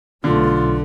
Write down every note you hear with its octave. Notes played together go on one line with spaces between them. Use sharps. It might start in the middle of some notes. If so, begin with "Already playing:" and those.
B1 D3 A3 D4 F4